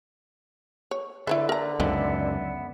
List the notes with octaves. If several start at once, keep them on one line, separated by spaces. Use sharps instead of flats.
C#5
D3 E4 A4 B4 C#5 E5
A#4 A#5
C#2 F#2 D#3 F3 B3 E5